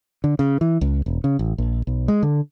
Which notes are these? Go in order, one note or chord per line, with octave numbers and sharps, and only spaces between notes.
D3
C#3
E3
C#2
E1
C#3
A1
A#1
B1
G#3
D3